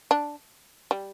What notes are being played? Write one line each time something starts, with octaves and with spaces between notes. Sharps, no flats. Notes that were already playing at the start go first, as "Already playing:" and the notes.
D4
G3